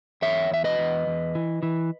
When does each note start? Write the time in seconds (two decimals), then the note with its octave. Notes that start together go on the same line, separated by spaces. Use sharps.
0.22 E2 C#5 E5
0.50 E2 E5
0.64 B4 D#5
0.79 E2
1.07 E2
1.35 E3
1.63 E3